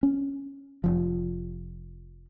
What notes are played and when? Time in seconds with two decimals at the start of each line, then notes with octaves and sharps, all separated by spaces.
0.03 C#4
0.84 F1 F3